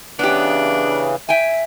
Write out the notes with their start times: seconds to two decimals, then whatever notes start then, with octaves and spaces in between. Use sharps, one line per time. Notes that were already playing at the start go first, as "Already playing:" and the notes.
0.19 C#3 E3 B3 D4 G4
1.29 E5 G5 G#5